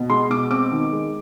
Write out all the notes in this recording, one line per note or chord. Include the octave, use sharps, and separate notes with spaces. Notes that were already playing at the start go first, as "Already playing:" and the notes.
Already playing: B2
G#3 C6
B2 D6
C4 D6
D#3
G#3